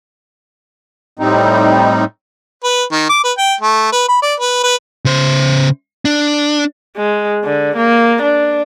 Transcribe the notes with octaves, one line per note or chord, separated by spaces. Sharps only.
A2 G3 C4 D#4
B4
D#3
D6
B4
G5
A3
B4
B5
D5
B4
B4
C#3 C5
D4
G#3
D3
A#3
D4